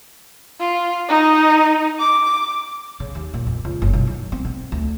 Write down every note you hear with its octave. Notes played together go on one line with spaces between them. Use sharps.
F4
D#4
D6
C#3
D#2
A#2
F2
C#2
F#1
B1
D#3
C4
D3
D2